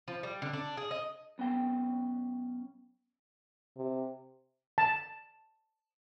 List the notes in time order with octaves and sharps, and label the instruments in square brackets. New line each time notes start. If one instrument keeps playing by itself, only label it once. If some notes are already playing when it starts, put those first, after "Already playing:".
[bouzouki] F3
G3
D3
D4
G#4
D#5
[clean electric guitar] B1 B3 C#4 G5
[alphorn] C3
[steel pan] A5